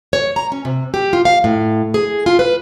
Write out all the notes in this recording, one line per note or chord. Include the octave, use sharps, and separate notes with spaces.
C#5
A#5
C#4
C3
G4
F4
F5
A2
G#4
F4
B4